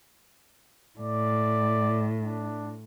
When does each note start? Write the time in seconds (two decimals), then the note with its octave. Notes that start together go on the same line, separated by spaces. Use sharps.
0.99 A2 D5
2.21 D4